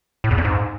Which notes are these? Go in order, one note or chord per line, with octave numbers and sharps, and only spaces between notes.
A2
E2
F2
G#2